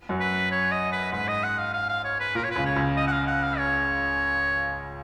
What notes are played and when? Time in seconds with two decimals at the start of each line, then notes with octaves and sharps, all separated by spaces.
0.09 F#2 F#3
0.20 B4
0.51 C#5
0.72 D#5
0.92 B4
1.12 G#2 B4
1.28 D#5
1.44 F#5
1.58 F5
1.74 F5
1.89 F5
2.04 C#5
2.20 B4
2.35 A#2 A#4
2.44 C#5
2.51 B4
2.56 C#2 C#3
2.66 C#5
2.76 C#2 C#3
2.97 D#5
3.07 F#5
3.12 F5
3.27 F#5
3.43 F5
3.58 C#5